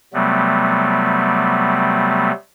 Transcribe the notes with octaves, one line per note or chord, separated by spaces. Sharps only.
C3 F#3 G3 A3 B3